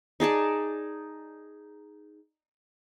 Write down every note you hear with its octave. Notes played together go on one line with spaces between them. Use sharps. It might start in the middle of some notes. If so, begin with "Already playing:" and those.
D#4 G#4 D5 A5